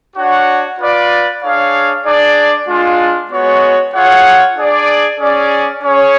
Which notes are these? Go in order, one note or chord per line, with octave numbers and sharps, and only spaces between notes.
D4 F#4 C#5 F#5
F4 B4 D5
D4 G#4 C#5 F5
D4 G#4 D5
G#3 D4 F4
G#3 B3 F#4 C#5
F4 G#4 C#5 F#5
D4 G#4 D5
C#4 G#4 D5
C#4 G#4 C#5